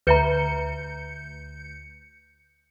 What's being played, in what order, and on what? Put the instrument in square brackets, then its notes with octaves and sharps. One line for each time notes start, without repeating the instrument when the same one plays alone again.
[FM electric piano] D2 G6 C#7 [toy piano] B4 E5 A#5